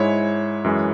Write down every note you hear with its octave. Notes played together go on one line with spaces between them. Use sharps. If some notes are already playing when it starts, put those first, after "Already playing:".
Already playing: G#2 G#3 E4 C#5
F#2 E3 G#3